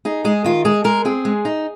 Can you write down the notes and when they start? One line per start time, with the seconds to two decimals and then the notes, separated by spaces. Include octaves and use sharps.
0.05 D#4 G#4
0.25 G#3 G#4
0.44 D#3 F4
0.65 G#3 G#4
0.84 G#3 A#4
1.05 C4 G#4
1.25 G#3
1.45 D#4